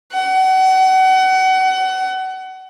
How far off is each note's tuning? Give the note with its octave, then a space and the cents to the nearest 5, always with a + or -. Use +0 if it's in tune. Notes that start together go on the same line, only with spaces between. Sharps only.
F#5 +30